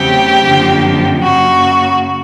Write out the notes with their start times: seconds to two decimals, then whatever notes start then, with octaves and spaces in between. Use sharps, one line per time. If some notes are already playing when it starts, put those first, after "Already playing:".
Already playing: E2 C#3 F#3 A3 C4 G4
0.43 F#2 D3 F3 A#3
1.23 F#2 C#3 F#3 A#3 F#4